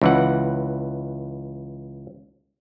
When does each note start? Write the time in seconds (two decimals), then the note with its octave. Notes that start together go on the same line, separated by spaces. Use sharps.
0.02 C#2 E3 F#5